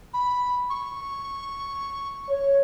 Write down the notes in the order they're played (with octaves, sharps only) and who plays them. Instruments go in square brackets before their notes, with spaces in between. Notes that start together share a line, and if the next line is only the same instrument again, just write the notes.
[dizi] B5
C#6
[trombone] C#5